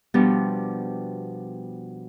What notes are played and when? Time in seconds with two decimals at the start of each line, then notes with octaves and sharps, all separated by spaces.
0.14 B2 F3 G3 B3 D4